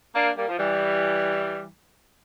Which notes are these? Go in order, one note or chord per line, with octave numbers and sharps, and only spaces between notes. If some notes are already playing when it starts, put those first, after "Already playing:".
A#3 D4
G3 A#3
F3
E3 G3